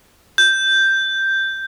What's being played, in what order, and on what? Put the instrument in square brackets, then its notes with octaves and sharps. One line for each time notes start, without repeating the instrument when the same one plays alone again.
[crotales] G6